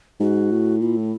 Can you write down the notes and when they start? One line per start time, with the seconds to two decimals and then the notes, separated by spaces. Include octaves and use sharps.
0.20 G#2 F#4
0.51 A2
0.81 A#2 E4
0.97 A2